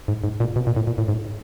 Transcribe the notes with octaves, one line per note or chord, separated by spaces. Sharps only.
G#2
G#2
A#2
B2
A#2
A2
A#2
A2
G#2